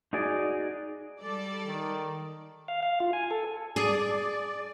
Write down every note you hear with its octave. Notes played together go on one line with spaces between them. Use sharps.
D#4 F#4 G#4 D5 D#5
G3 A4 D5
D#3
F5
F5
F4
G#5
A4
G#4 D5